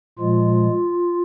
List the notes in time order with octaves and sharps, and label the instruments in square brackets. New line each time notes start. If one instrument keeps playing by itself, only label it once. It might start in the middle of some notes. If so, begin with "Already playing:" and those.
[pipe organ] A#2 F3 G#3 F4